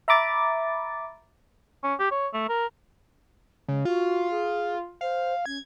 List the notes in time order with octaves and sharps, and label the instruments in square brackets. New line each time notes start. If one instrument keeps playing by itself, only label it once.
[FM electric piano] E5 A#5 B5 D6 A6
[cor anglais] C#4
G4
C#5
A3
A#4
[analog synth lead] C#3 [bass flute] G#3
[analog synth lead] F4 [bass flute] F#4
[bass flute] G#4
[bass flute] C5 [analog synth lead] F5
[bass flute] C#4 [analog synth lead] G#6